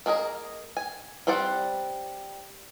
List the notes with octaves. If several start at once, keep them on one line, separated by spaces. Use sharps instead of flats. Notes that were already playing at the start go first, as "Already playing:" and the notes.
A#3 G#4 A#4 D#5
G#5
G3 C4 C5 D5 F#5